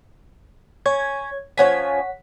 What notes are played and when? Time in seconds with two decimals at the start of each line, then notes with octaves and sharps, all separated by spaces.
0.86 C#4 C#5 G#6
1.58 F3 C#4 C#5 F#5 G#5 B6